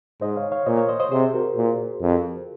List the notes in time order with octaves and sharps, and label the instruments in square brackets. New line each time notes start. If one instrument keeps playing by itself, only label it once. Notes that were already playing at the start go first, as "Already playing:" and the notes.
[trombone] G#2 [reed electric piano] C5 D#5
[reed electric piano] C#5 F5
C#5 F5
[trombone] A#2 [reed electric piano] C5 D#5
[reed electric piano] C#5 F5
C5 D#5
C5 D#5
[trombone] C3 [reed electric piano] G#4 C5
[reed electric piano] F#4 A#4
[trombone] A#2
F2